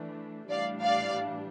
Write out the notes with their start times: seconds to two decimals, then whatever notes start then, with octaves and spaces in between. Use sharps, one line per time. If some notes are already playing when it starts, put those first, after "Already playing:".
Already playing: E3 A3 D4
0.49 A2 E3 G3 D4 D5 F5
0.82 D5 F5